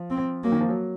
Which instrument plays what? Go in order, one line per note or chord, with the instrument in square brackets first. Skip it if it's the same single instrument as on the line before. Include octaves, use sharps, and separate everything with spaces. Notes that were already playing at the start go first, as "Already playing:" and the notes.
Already playing: [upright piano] F3
[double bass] C4
[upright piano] F#3 [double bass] A#3
[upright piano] D#3
F3
F#3